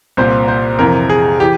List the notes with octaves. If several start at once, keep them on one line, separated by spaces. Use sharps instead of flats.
C2 A#2 C5
C5
F2 C3 E3 A#4
G#4
E3 G4